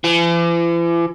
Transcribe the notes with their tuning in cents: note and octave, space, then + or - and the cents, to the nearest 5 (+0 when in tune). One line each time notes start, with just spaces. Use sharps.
E3 +45